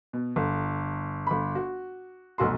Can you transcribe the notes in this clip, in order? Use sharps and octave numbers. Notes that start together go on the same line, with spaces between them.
B2
G1
G1 B5
F#4
F1 B1 F#4 C6